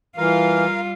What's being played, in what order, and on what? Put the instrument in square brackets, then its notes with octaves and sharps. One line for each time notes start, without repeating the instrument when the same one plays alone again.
[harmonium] E3 [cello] G3 F4 [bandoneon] A#4 F5